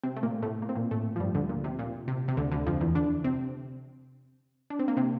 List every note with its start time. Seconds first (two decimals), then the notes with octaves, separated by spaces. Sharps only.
0.04 C3 C4
0.16 A3
0.23 A#2 A#3
0.42 A2 A3
0.62 A#3
0.69 C4
0.75 A#2 A#3
0.91 A2 A3
1.16 F3
1.20 G2 G3
1.35 D2 D3
1.49 A#2
1.64 C3
1.79 A#2
2.08 C3
2.28 C3
2.37 D2 D3
2.52 D2 D3
2.66 F2 F3
2.80 E2 E3
2.95 D3 D4
3.24 C3 C4
4.70 D4
4.79 C4
4.88 A#3
4.97 C3 C4